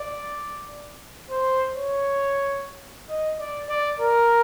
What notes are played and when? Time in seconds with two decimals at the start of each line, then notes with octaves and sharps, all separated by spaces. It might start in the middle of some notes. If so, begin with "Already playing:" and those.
Already playing: D5
1.30 C5
1.76 C#5
3.09 D#5
3.39 D5
3.69 D5
4.00 A#4